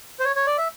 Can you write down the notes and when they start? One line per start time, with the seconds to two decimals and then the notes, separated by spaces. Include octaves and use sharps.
0.20 C5
0.25 C#5
0.36 C#5
0.47 D5
0.58 E5